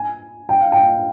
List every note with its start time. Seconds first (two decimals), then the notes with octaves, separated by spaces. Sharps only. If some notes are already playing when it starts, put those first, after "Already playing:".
Already playing: G#5
0.49 G5
0.61 F5
0.72 G5